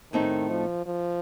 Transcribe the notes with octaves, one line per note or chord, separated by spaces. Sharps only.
A2 D#3 A3 C4 D#4
F3
F3